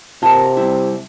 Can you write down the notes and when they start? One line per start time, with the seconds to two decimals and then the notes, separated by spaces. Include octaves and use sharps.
0.23 C3 F4 A#4 A5
0.57 G3 C4 E4